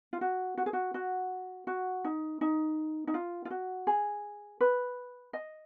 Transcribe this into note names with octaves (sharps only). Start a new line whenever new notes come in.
F4
F#4
F#4
G#4
F#4
F#4
F#4
D#4
D#4
D#4
F4
F4
F#4
G#4
B4
D#5